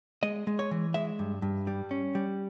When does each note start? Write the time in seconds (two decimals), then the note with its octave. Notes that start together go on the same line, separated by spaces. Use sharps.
0.23 G#3 D#5
0.47 G#3
0.59 C#5
0.71 E3
0.94 G#3 E5
1.19 G2
1.42 G2
1.67 G3
1.91 C#4
2.15 G3